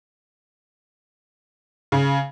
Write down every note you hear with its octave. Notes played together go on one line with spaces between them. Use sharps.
C#3